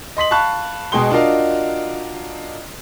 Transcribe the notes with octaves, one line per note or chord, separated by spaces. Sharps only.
D#5 C6 B6 F#7
F5 A5 B5 C#6 F#6
B2 G#3 G#4 G5 C6 G7
D4 F4 F#4 A#4 D#5 F5